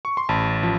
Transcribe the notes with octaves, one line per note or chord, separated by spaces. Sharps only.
C#6
C6
A1 A5 B5
F3